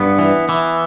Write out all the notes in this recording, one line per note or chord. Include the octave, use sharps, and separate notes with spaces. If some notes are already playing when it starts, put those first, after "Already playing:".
Already playing: G2 B3
E3
E3